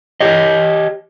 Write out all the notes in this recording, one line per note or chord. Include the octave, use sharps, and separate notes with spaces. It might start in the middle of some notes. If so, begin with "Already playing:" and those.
G4 C#5 D#5